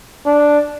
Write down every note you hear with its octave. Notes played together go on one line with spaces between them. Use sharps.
D4